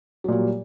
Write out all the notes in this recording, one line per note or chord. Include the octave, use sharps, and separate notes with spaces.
A#2 F#3 G3